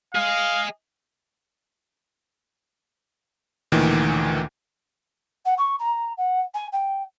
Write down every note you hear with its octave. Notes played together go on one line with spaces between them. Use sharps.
G#4 D#5 F5
D2 A#2 D#3 E3
F#5
C#6
A#5
F#5
G#5
G5